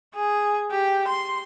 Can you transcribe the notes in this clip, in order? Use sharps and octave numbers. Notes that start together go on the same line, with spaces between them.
G#4
G4
C6